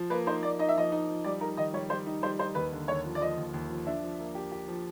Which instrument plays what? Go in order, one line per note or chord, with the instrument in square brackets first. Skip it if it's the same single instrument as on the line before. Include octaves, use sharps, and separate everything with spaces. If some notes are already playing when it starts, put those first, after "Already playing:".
Already playing: [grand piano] F3
[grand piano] A#3 [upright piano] B4
[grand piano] D#4 [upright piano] C5
[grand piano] A#3 [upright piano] D5
[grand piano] D#4 [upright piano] D#5
[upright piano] E5
[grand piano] F3 [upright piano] D#5
[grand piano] D#4
F3
[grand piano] G3 [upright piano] D5
[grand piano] D#4 [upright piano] A#4
[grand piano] D#3 [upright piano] D#5
[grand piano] G3 [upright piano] C#5
[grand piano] G3 [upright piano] C5
[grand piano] D#4
[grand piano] G3 [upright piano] C5
[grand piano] D#4 [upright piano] C5
[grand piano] D#2 [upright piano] B4
[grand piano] D3
[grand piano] D#2 [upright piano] C#5
[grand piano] F3
[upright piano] D5
[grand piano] F3 [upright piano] D#5
[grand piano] D#2
D#2
F3
[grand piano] D4 [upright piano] E5
[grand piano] F3
A#3
G4
G4
F3